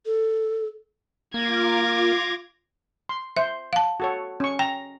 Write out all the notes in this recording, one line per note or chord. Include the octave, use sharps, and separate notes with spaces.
A4
A#3 F4 F5 D6 G#6 A#6
C6
C5 E5
F5 A5
F#4 A4 C#5
C#4 C#6
G5 A#5